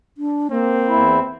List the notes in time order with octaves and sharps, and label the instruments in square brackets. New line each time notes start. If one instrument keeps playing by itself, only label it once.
[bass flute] D4
[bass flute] A#3 [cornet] C4
[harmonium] E2 E4